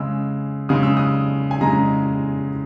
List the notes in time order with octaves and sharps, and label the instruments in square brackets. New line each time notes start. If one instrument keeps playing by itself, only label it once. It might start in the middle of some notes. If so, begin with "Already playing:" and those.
Already playing: [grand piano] C#3 G#3 E6
C#3 G#3 D#6
E6
D#6
G#5
C#3 G#3 A#5